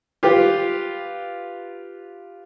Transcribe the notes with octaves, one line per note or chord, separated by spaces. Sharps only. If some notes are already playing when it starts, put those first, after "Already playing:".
F4 G4 B4